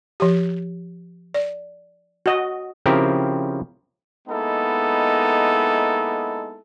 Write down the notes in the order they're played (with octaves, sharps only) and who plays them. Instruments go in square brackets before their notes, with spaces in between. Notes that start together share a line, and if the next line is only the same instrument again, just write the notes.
[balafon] F3 G4
D5
[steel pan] F#4 D#5
[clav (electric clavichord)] C#3 F3 C4 E4 G4 A#4
[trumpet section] G#3 A#3 B3 D#4 E4 A4